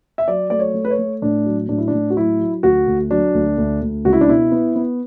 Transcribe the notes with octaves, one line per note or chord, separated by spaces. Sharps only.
E5
F#3 D5
A3 D5
C#5
A3
B4
C#5
A3
A2 D4
F#3
A2 D4
E4
A2 D4
F#4
F#3 E4
F#3
D2 F#4
D2
F#3 D4
D2
D2
D2
C#2 F#4
E4
D4
B2 E4
B3
B3